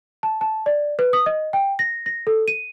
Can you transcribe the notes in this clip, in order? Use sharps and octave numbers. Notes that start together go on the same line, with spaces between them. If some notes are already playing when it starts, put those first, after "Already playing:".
A5
A5
D5
B4
D#6
D#5
G5
A#6
A#6
A4
D#7